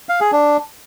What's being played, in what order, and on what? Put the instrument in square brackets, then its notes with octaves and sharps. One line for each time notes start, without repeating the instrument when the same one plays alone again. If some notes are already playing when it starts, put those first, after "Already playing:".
[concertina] F5
G#4
D4